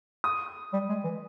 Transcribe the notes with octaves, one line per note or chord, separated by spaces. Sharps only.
D#6
G3
G#3
E3